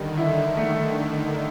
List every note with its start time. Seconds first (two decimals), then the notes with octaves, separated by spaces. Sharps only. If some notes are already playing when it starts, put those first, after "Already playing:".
Already playing: D3 D#3 G3
0.17 D#3 E4
0.57 A3